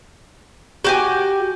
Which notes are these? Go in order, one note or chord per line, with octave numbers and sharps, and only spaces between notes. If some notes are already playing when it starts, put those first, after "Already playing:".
F#4 G4 G#5